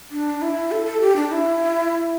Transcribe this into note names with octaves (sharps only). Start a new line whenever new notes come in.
D4
E4
A4
A4
G4
D4
E4